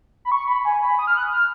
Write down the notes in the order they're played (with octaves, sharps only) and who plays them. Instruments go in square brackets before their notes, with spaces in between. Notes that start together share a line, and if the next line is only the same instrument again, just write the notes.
[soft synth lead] B5
C#6
B5
G#5
B5
D#6
F6
F#6
F6